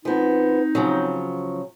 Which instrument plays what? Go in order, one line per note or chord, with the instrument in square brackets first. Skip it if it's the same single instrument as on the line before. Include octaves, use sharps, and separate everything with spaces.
[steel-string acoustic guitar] F3 B3 [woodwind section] C4 D#4
[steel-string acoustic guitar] C#3 F3 F#3